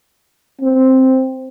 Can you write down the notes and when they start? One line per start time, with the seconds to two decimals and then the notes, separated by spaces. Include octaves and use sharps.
0.61 C4